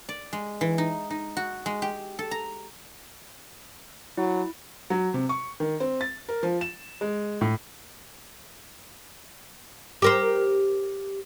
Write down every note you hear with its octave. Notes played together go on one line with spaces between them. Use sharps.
D5
G#3
E3
D#4
D#4
F#4
G#3
G4
A4
A#5
F#3 E4
F#3
C3
C#6
D#3
C4
A6
A#4
F3
E7
G#3
A2
G4 A#4 C5